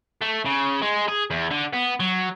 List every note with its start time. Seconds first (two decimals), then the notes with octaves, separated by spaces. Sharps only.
0.22 A3
0.46 C#3
0.82 G#3
1.08 G#4
1.31 E2
1.51 D3
1.73 B3
2.00 F#3